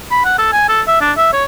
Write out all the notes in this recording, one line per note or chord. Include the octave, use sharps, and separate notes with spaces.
B5
F#5
A4
G#5
A4
E5
D4
E5
C#5